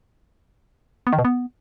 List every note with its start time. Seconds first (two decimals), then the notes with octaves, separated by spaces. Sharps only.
1.07 B3
1.13 D#3
1.19 B2
1.25 B3